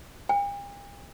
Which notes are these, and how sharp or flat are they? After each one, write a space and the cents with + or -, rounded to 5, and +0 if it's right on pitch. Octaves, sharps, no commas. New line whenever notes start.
G5 +45